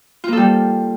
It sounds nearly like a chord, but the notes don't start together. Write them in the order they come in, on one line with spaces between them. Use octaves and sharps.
F4 A#3 A4 G3